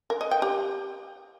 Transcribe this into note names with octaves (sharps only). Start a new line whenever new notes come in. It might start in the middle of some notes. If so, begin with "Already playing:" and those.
A#4
D#5
G5
G4